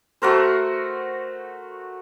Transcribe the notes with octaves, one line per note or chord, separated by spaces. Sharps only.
A3 F#4 A#4 C5